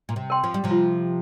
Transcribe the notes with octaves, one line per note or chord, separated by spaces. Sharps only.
A#2
C3
A#4 G5 C6
F3
G3
C3 F3
F4